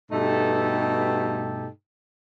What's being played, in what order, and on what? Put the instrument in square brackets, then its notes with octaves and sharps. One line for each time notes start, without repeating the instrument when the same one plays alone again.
[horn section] G2 B2 A3 D#4 G4 A4